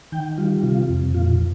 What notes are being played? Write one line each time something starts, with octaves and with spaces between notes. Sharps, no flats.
D#3 G5
G3 F4
C3 F4
F2
A#2 F4